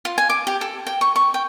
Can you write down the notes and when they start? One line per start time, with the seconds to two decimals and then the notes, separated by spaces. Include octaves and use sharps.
0.05 F4
0.18 G#5
0.30 D6
0.47 G4
0.61 A4
0.87 G5
1.01 C#6
1.16 C#6
1.34 G5